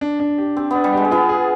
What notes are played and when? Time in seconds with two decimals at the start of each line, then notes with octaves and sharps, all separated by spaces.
0.01 D4
0.20 D4
0.38 G4
0.57 C4 G4
0.71 B3 D4
0.84 G3
0.93 G#3 G4
1.05 G#3
1.11 B3 F4
1.29 G#4